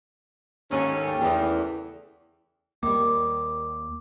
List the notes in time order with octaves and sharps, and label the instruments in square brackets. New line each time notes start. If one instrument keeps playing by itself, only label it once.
[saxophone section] D#2 C#4 [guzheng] G#2 A4
[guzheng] G4 A#4 D5
[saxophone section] E2 [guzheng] C#3 A3
[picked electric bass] D#2 A#3 [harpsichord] D#3 G3 [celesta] D6